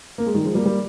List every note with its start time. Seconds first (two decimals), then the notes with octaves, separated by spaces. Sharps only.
0.18 A#3
0.26 G#3
0.34 D#3 G3
0.44 F3 G#3
0.55 G3 A#3
0.66 G3 A#3